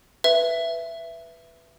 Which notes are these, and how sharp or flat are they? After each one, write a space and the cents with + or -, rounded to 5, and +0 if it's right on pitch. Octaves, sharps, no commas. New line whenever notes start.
B4 +0 E5 +15